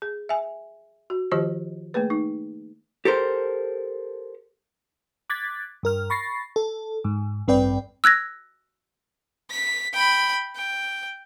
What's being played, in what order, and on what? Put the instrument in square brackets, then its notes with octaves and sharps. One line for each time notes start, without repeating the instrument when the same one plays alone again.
[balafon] G#4
E5 G#5
F#4
D#3 F3 F4 G4 C5 D#5
A3 A#3 G#4 B4
D#4
[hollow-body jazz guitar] G4 A4 A#4 C5
[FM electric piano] D6 F#6 G#6 A6 B6
G2 A#4 F6
B5 C#6 A6 A#6 C7
A4
G#2
A1 G2 C4 B4 D5 G5
[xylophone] E6 F#6 G#6 A#6
[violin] B6
G5 B5
G5